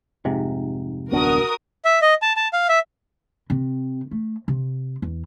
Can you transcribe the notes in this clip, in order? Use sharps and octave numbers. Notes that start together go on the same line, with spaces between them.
F1 G#2 C3
D1 B3 D4 F#4 A#4 D#6
E5
D#5
A5
A5
F5
E5
C3
A3
C3
E2